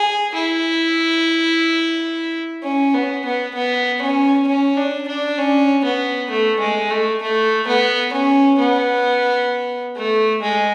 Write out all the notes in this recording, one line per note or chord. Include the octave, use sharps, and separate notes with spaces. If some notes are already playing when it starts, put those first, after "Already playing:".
Already playing: G#4
E4
C#4
B3
B3
B3
C#4
C#4
D4
D4
C#4
B3
A3
G#3
A3
A3
B3
C#4
B3
A3
G#3